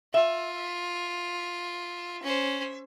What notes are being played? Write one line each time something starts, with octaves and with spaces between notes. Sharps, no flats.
F4 E5
C#4 C5